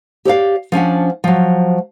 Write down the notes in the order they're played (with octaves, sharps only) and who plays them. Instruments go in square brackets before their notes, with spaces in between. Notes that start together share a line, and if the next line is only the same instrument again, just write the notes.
[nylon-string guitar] G4 C#5 D5 F5
F3 C#4 D4 F#5
F3 F#3